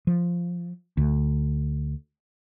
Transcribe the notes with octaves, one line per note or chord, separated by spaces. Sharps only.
F3
D2